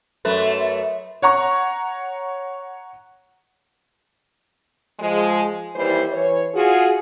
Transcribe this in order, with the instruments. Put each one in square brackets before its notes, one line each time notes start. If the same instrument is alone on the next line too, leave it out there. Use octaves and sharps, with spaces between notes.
[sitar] F#2 A3 B4
[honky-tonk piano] C#5 F#5 A#5 C#6
[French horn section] F3 G#3
D#2 E3 G3 E4 C5
E3 C#5
F4 F#4 G#4